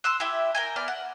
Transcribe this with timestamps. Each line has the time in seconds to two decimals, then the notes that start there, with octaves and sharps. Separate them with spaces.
0.04 C6 D#6 E6 F#6
0.20 E4 G4 E5
0.55 A#4 G5 G#5
0.76 B3 D5 F6
0.88 F#5